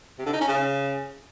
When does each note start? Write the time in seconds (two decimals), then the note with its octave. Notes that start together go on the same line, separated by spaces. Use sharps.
0.19 C3
0.26 D3
0.33 D#4
0.41 C#4
0.48 C#3